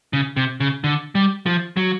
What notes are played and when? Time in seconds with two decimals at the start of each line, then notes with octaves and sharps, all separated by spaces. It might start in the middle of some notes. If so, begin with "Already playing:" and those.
0.13 C#3
0.37 C3
0.60 C#3
0.84 D3
1.15 G3
1.46 F3
1.77 F#3